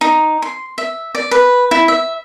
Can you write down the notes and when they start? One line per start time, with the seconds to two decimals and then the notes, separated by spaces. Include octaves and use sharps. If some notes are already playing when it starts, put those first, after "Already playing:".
0.01 D#4
0.42 C6
0.78 E5
1.15 D5
1.31 B4
1.71 E4
1.88 E5